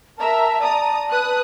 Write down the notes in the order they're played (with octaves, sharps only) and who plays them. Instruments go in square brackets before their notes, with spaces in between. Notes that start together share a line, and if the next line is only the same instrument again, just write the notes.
[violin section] A#4 E5 A#5 [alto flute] A5
[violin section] D5 A#5 D#6
B4 D#6 F#6